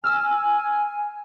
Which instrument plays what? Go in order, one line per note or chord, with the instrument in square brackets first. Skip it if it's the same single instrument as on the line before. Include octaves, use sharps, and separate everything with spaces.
[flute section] G#5 [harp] E6 F6